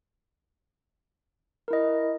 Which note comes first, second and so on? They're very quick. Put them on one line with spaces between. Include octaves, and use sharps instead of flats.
A#4 E4 D#5